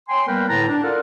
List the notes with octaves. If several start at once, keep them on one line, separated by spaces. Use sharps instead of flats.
C#5 G5 G#5 C6
G3 A#3 B3 A#4 B4 G5
A2 D3 E4 B4 A5 A#5
D4
F4 A4 A#4 D5 F5 F#5